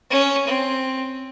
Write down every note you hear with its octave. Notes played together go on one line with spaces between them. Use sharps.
C#4
C4